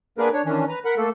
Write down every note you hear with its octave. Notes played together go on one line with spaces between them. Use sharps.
A#3 B3 D4 G#4 A#4 B4
D4 C#5
D#3 E3 C#4 D4
B4 A#5
A#4 F#5 B5
A3 A#3 A4